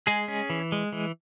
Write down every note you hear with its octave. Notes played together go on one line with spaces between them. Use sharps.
G#3 G#4
C#4
E3
G#3
E3